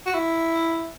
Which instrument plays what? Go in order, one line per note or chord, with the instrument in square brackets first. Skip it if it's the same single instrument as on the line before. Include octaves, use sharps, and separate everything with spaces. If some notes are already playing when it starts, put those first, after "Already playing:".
[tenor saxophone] F#4
E4